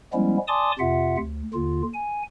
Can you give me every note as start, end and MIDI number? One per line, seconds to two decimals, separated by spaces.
0.13 0.37 53
0.13 0.37 55
0.13 0.37 56
0.13 0.37 59
0.13 0.37 61
0.13 0.37 64
0.48 0.71 74
0.48 0.71 80
0.48 0.71 81
0.48 0.71 84
0.48 0.71 86
0.48 0.71 87
0.79 1.17 41
0.79 1.17 48
0.79 1.17 65
0.79 1.17 76
0.79 1.17 78
1.18 1.43 38
1.54 1.82 39
1.54 1.82 50
1.54 1.82 65
1.93 2.23 80